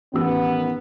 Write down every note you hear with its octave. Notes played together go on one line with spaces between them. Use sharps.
A1 D#3 B3 G4 E6